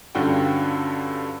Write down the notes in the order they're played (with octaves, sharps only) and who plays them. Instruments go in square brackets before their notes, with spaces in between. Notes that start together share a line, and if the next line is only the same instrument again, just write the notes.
[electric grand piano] G2 D3 C#4 F4 F#4 G5